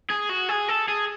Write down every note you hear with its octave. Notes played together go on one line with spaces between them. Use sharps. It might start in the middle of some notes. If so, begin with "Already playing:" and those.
G#4
F#4
G#4
A4
G#4